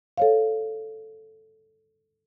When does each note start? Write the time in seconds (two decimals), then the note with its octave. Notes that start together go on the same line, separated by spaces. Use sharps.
0.18 A4 C#5 F5